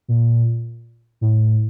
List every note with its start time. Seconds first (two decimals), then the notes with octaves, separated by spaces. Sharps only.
0.08 A#2
1.21 A2